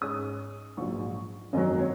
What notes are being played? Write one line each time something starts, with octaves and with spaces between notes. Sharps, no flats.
G#2 G#3 C#4 D#6
A#1 G#2 F#3 C#6
G#1 F#2 D#3 F#3 D#5
C#5